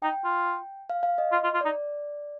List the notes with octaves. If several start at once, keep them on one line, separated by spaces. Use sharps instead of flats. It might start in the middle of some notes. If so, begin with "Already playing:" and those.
D#4 G5
F4
F5
F5
D#5
F4
F4
F4
D#4 D5